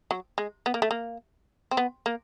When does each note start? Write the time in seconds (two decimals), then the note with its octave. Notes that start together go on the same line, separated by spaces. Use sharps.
0.11 F#3
0.38 G#3
0.66 B3
0.74 A#3
0.82 A3
0.91 A#3
1.71 C4
1.77 B3
2.06 A#3